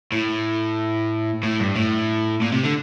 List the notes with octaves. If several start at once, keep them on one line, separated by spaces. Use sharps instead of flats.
A2
A2
G2
A2
A#2
C3
D3